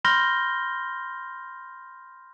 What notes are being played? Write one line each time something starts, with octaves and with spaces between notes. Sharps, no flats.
B5 C6 F6 G6 A#6 G7